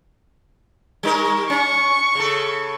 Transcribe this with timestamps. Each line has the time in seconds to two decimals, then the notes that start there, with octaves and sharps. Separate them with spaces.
1.03 G3 D#4 A#4
1.50 C#4 C#6
2.15 C#3 A4